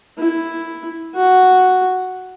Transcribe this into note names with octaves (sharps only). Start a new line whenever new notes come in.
E4
F#4